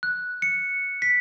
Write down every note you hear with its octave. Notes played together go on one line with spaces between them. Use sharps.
F#6
C#7
B6